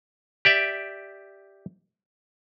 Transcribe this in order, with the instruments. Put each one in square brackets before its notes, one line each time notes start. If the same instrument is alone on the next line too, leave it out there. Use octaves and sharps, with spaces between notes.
[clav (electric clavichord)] G4 D5 E5